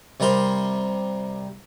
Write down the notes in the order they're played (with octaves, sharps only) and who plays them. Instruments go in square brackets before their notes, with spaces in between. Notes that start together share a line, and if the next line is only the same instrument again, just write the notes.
[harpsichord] C3 G3 A#4 C5